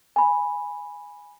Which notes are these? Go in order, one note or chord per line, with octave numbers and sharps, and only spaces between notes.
G#5 B5